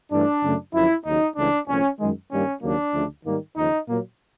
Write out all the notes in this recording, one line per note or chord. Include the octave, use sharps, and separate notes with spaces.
G2 E3 A3 D4
F#2 C#3 F#3 A3
F#2 D3 F3 E4
D#2 C#3 F#3 D#4
C#2 C#3 E3 A3 D4
C2 A#2 F3 A3 C#4
F#2 D#3 G#3
G2 D#3 G3 A#3 C#4
D#2 C#3 F#3 A#3 D4
D2 C#3 F3 A3
G#2 D#3 G3 A#3
D#2 C#3 F3 D#4
A#2 F#3 A#3